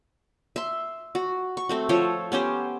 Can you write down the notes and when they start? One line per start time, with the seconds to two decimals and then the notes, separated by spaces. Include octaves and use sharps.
0.56 E5 C6
1.15 F#4
1.57 C#6
1.69 A3 C4 F#4
1.89 F3 A4 C5 C#5
2.32 B3 C#4 G4 C5